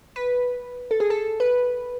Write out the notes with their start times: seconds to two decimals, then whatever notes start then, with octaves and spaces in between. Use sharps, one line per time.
0.16 B4
0.91 A4
1.00 G#4
1.10 A4
1.40 B4